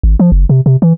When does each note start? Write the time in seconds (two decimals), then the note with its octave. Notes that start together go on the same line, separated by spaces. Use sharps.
0.03 G#1
0.20 F3
0.32 F#1
0.49 C3
0.66 C3
0.82 E3